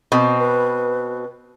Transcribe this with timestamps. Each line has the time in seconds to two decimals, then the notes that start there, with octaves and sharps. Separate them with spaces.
0.12 B2 C4
0.39 B4